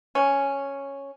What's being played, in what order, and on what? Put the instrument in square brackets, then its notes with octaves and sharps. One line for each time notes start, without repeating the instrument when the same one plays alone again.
[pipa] C#4